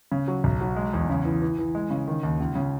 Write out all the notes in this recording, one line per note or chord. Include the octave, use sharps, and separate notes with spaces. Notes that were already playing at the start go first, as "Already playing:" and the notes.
C#3
F#3
B1
F#3
G#3
E2
C#3
E3
E3
E3
G#3
C#3
D#3
D#2
C#2
C#3